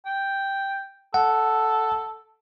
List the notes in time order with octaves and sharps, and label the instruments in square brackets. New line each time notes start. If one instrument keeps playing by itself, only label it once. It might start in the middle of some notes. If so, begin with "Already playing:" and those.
[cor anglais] G5
[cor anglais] A4 [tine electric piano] F#5